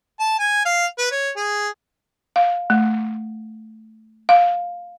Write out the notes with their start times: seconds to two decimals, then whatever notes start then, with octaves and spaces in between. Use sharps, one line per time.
0.19 A5
0.39 G#5
0.65 F5
0.98 B4
1.11 C#5
1.36 G#4
2.36 F5
2.70 A3
4.29 F5